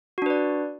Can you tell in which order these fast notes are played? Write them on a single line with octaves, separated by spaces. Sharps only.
F#4 D4 B4 D5